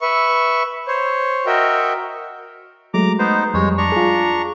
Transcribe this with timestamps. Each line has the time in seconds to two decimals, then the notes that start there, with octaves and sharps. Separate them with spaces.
0.01 B4 E5 C#6
0.88 C5 C#5
1.46 F#4 A#4 D#5 E5 G5
2.94 F#3 G#3 A3 A#5 D6
3.19 B3 D#4 C5
3.54 F2 G3 G#3 C#5
3.78 D4 A#5 C#6
3.92 F4 G#4